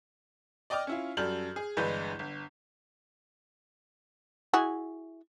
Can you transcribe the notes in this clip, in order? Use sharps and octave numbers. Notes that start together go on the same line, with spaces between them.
D5 D#5 G5 D6 F6
C#4 E4 F4
F#2 G3 A4 F6 G6 F#7
G#4
G1 G2 E3 G#3 B4 G6
G1
E4 F#4 G#4